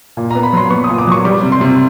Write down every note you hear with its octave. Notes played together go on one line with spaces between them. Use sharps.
A#2
B3 A#5
B5
F#3 C6
B3 C#6
D#6
A#2
D6
F#3 C#6
G3 D6
C3
C6
C3